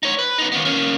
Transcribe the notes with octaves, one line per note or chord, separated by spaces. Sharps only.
D#4 C#5
B4
B3 D#4
D#2 B3
A#3 C#4